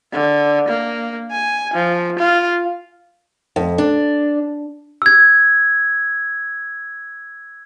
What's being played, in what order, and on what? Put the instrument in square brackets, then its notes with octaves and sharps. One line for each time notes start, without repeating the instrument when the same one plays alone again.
[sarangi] D3
A#3
G#5
F3
F4
[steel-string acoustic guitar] F2
D4
[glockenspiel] E6 G#6